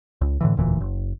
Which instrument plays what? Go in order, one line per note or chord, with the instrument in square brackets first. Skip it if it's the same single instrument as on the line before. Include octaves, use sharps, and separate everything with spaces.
[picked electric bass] C#2
A2 D3 E3
E1 D2 A#2 E3
F#1